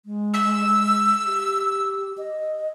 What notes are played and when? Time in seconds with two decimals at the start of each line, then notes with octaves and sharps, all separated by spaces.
0.06 G#3
0.34 E6
1.27 G4
2.18 D#5